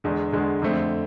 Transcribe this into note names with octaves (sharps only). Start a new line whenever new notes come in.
E2 D3 G#3
E2 D3 G#3
F2 D3 A3 C4